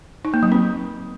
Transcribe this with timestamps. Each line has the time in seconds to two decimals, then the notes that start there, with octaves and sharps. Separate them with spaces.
0.25 D#4
0.34 A#3
0.43 F#3
0.52 C4